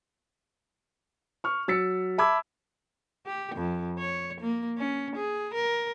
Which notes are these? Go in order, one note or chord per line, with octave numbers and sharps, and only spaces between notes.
C#6 F6
F#3 E6 A6 B6 C#7
E5 A5 B5 D6 E6 G#6
G4
F2
C#5
A#3
C#4
G#4
A#4